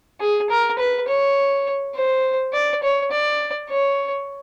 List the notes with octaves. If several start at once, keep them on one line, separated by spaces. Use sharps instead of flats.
G#4
A#4
B4
C#5
C5
D5
C#5
D5
C#5